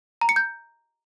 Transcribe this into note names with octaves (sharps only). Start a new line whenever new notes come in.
A#5
C#7
G6